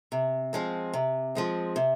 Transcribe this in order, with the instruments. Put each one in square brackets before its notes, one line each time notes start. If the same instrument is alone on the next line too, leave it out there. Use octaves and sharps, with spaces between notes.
[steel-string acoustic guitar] C3
F3 G#3 C4
C3
F3 G#3 C4
C3